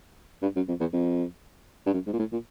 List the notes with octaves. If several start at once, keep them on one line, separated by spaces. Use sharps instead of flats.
G2
F#2
F2
E2
F2
G2
F#2
G#2
A#2
A2
A#2